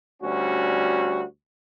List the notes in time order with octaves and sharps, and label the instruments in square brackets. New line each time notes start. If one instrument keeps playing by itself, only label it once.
[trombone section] D2 G3 C#4 F#4